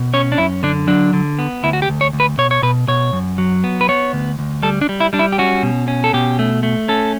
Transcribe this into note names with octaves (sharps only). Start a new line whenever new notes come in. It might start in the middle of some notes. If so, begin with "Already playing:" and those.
Already playing: B2
C#4 C#5
D4
F#2 E4
D3 D4
F#3 D4
D3
B3
D2 E4
F#4
G4
D2
C#5
D2
B4
B2 C#5
C#5
B2 B4
B2 C#5
F#2
F#3
B3
B4
B3 C#5
D2
D2
G3 A4
D4
G3
E4
G3 D4
E4
G4
C#4 F#4
B2
C#4
A4
B2 G4
A3
A3
C#4 A4